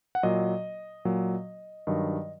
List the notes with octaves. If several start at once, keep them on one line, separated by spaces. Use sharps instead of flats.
F#5
A#2 F#3 D#5
A#2 F#3
G2 D#3 F#3 D#5